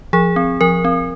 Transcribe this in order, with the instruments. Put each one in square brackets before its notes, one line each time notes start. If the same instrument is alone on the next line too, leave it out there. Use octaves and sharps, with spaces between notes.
[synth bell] F3 G#4
C4
F3 A#4
C4